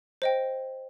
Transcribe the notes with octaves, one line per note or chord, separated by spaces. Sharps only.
C5 D#5 G5